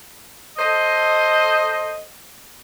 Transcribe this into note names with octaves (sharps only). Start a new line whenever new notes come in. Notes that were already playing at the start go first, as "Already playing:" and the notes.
A4 C5 D#5